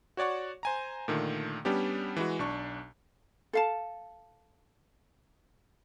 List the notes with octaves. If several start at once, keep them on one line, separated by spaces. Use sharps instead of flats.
F#4 C#5 D5 F#5 C#6
C5 G#5 A#5
A#2 D3 D#3 A3
G3 B3 C#4 D4 G4
E3 G#3 F#4
B1 D4 C#6
A4 F5 A5